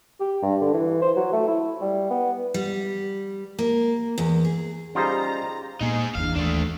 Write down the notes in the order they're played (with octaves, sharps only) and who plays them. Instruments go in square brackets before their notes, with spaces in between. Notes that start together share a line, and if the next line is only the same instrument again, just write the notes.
[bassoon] G4
G2
D3
E3
C5
F#3
A3
E4
G3
B3
[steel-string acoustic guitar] G3
A#3
E2
G#4
[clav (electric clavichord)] G3 D#4 C5 [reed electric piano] C#4 G4 G#4 [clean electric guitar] F4 [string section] A#5
[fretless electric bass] A#2 A#3 B3 [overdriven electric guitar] D#4 G#4
[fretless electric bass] G1 E2 D4 [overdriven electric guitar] F5
[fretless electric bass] D#2 E3 [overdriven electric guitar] A3 D4